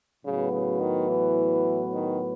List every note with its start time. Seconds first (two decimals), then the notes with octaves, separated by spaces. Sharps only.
0.24 A2 C#3 F#3 B3 F#4 B4
0.52 C#3
0.80 D#3
1.09 E3
1.93 D#3